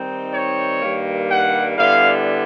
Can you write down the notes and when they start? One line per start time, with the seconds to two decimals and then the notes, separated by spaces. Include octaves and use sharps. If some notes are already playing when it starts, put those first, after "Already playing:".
Already playing: D#3 G3 C4 D#4
0.34 C#5
0.82 G2 D#3 G3 A#3
1.31 F#5
1.78 D3 G3 B3 E4 F5